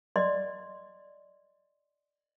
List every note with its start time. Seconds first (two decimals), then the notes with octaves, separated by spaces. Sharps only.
0.16 D5 D#5 C6